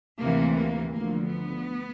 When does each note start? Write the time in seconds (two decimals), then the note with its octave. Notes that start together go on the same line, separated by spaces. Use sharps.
0.21 D2 C3 E3 A#3
0.57 A#3
0.94 D2 D3 F3 A#3
1.31 B3